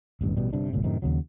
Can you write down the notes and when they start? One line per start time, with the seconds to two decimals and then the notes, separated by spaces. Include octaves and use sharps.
0.21 D1 A1 G2
0.37 A1 B2 G3
0.53 G1 G2 C3 D4
0.73 G#1 C#2 A#2 C#3
0.84 F#2 A2 C3 D#3
1.02 D#2 C#3 F#3